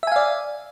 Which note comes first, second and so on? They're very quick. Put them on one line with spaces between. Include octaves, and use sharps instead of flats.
E5 G#5 F5 D5